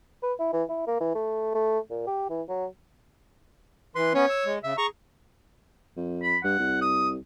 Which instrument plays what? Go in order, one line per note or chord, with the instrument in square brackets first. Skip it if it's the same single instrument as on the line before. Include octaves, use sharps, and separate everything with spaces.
[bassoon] B4
E4
E3
E4
A#3
E3
A3
A3
A#2
G4
E3
F#3
[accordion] E3 C6 [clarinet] B4
[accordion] B3 C#4 [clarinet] C#5
[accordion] E6
G#3
[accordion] C#3 [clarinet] E5
[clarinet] G#4 [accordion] A#5 C#6
[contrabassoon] F2
[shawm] B5
[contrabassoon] G2 [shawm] F#5
[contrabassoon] C2
[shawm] D#6